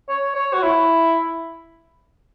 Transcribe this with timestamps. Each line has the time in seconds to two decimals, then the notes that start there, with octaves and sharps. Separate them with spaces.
0.09 C#5
0.35 C#5
0.53 F#4
0.62 E4